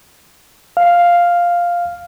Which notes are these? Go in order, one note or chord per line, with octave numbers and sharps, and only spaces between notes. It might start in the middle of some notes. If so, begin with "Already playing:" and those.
F5